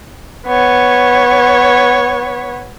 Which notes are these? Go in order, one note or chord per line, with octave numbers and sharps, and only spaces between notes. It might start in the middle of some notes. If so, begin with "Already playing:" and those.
B3 C#5